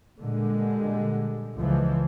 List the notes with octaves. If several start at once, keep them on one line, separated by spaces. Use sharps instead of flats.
A#2 D3 G3 G#3
C#2 E3 F3